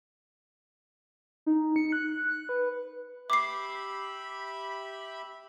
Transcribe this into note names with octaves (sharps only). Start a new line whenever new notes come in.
D#4
C#7
F#6
B4
G4 E5 B5 D6 C7